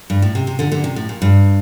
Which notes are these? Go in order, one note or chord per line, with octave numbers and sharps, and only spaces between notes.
G2
A2
C3
C3
A#2 D3
A#2 D3
C3
A2
A#2
G2